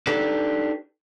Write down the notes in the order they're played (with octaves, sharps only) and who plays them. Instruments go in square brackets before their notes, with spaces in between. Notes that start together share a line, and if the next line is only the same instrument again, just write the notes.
[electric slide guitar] D4 D#4 G4 A4 B4